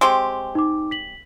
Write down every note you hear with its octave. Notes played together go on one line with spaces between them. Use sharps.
G#3 C4 G4 C#6
D#4 D6
B6 F#7